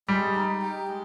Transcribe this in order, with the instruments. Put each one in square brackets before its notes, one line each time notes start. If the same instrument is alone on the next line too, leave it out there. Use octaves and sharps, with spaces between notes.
[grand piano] G3 [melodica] G#3
[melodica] D#4
G4
G#3